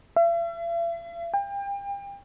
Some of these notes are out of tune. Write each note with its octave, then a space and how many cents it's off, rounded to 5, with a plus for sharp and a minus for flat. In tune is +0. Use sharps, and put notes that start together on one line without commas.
E5 +45
G5 +35